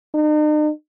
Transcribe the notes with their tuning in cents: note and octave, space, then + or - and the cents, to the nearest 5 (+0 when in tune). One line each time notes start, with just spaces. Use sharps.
D#4 -45